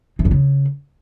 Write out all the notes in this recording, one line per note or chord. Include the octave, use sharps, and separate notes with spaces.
E3
F2
C#3